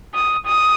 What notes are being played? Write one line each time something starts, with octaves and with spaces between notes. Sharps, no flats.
D#6
D#6